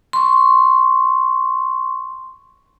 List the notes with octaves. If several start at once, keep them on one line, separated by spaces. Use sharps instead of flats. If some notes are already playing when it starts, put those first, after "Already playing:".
C6 C#6